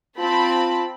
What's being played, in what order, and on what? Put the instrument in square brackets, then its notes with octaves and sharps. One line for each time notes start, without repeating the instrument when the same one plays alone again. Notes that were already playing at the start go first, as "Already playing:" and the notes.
[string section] C4 A5 B5 [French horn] F4